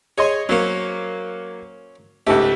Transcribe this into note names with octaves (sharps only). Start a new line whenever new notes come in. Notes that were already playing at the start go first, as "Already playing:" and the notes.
G#4 C#5 D#5 G#5 C6
F#3 A#3 C#4 C5 C#5
C#2 G#2 A3 G4